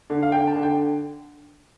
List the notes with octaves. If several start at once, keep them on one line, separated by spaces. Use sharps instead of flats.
D3
F5
D3 G5
A5
D3
G5